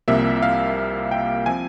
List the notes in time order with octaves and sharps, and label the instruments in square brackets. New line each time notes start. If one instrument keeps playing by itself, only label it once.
[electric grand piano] C2 C3 F3 A#3 E5
F5
G5
F3 C4 G#5